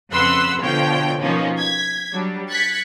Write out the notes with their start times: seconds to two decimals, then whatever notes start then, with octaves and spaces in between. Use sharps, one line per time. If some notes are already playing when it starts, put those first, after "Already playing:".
0.12 F2 C#3 B4 F#5 C6 E6
0.61 B2 D3 F3 F4 C#5 G5
1.21 B2 F3 A#3 C#4 D#4 F4
1.59 G#6 B6
2.13 F#3 G3 D4
2.50 F#6 G#6 A6 B6 C#7